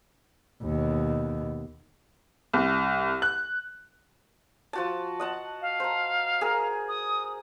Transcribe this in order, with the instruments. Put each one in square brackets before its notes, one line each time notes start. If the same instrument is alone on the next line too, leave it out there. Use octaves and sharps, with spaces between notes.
[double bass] D#2 B2
[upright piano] C2
F#6
[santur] F3 F#4 A5
D#5 F#5 A5
[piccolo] F5
[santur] C5 A#5
G#4 A#4
[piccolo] D#6